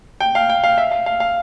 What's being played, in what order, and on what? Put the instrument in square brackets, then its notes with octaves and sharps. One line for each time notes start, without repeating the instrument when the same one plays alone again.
[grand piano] G5
F5
G5
F5
E5
F5
F5
F5